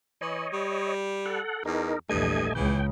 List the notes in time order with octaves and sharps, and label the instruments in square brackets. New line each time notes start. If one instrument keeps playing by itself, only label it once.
[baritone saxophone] E3 [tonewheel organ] C#5 D#5
[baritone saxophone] G3
[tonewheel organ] A4 F#5
[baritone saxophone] E2 [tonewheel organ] D#4 A#4
[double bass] A#1 E2 [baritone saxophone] G2 [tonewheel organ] A3 D#5 G#5
[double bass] C#2 C#3 [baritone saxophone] E3 [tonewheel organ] G5